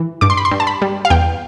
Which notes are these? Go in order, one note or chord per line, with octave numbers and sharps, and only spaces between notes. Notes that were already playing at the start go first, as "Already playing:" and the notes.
Already playing: E3
G2 D6
C6
B5
C6
G2
A5
B5
G3
F5
E2 G5